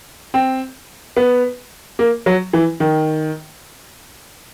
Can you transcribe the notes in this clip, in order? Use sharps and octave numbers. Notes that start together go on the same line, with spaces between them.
C4
B3
A#3
F#3
E3
D#3